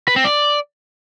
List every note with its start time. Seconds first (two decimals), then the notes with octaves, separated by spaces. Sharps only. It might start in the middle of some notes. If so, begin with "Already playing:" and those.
0.08 B4
0.16 C4
0.24 D5